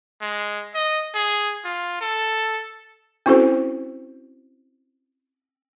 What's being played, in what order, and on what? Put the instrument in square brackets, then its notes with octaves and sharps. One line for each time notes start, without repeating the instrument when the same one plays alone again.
[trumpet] G#3
D#5
G#4
F4
A4
[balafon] C4 C#4 E4 F#4 A4 C5